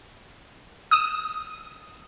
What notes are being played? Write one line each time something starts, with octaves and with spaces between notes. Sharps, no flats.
D#6 E6